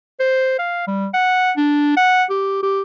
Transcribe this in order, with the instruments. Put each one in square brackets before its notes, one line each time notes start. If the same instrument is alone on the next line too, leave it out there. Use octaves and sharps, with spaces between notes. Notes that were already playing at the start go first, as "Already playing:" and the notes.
[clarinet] C5
F5
G3
F#5
D4
F#5
G4
G4